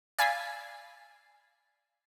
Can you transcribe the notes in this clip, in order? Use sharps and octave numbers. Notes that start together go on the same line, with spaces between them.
D5 F5 G#5 B5 E6 C7